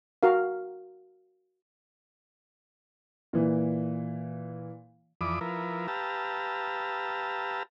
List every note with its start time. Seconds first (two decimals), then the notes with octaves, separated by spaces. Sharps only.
0.23 F#4 A#4 F5
3.33 A#2 E3
5.21 F2 E3 D5 B5 D6 D#6
5.41 F3 E4 A#4 B4
5.88 G4 B4 F5 A5 A#5 E6